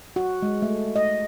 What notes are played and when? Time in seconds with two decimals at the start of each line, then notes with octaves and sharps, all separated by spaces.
0.16 F#4
0.42 G#3
0.62 A3
0.96 D#5